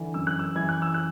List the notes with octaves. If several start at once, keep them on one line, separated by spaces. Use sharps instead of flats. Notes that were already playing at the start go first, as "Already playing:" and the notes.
Already playing: D3 E3
F#2 E6
F#6
E6
E3 G#6
F#6
E6
F#6